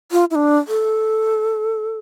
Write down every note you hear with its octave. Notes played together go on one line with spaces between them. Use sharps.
F4
E4
D4
A4